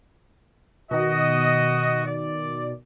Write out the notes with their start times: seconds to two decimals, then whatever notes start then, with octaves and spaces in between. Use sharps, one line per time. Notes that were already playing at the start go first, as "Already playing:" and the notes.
0.91 B2 D#3 F#4 D#5
2.05 D5